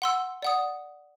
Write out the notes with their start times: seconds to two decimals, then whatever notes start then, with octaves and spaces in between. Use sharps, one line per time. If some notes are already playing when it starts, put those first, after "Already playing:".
0.02 F#5 C6 E6
0.42 D5 F#5 D#6